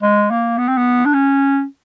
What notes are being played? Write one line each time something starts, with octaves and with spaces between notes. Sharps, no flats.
G#3
A#3
B3
C4
B3
D4
C#4